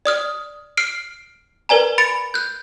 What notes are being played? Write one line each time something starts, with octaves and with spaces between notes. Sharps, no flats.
D5 D#6 F6
F6 C7 D7
A#4 B4 D5 G#5 A#5
B5 A6 C#7 D7
F#6 G6